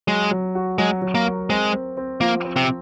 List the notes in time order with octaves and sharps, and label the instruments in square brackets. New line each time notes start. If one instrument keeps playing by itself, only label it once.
[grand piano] F#3 [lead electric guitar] G#3
[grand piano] F#3
F#4
[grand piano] F#3 [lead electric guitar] G#3
[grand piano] F#3
[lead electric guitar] A#3
[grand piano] A#4
[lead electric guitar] G#3 [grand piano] C4
[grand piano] C4
C4
[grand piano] F3 [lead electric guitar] A#3
[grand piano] C4
[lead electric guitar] C3